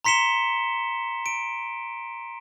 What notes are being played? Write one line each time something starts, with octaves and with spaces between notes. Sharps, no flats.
A#5 C6 B6 C#7 E7 G7
D7